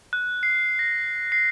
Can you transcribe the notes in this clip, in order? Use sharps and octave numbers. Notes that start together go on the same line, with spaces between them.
F#6
C7
A#6
C7